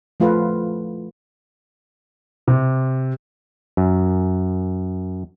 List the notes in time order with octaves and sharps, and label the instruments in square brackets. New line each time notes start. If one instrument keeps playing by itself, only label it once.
[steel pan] F3 A3 F4 A4 B4
[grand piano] C3
[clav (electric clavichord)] F#2